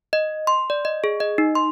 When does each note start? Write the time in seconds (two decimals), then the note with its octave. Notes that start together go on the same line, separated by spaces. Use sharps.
0.13 D#5
0.47 C6
0.70 D5
0.85 D#5
1.04 G#4
1.20 D#5
1.38 D#4
1.55 C6